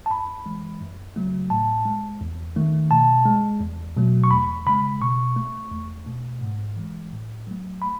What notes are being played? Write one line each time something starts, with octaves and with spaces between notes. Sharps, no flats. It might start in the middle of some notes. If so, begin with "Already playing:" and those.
A5
F#2 B5
E3 G#3
F#2
C#3 F#3 A3
A2 A5
G#3
E2
D#3 A3
B2 A5
G#3
E2
B2 F#3 A3
C#6
E2 B5
C#3 G#3 B5
B2 C#6
A3
E2
B2 A3
G#2
E3 G#3
A2
F#3 A3
B5